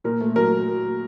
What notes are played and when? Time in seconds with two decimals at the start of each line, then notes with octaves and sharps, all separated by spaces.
0.04 A#2 A#4
0.21 A3
0.36 F#3 A#4